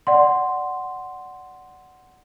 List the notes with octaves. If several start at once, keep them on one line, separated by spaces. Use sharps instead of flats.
D5 F#5 C6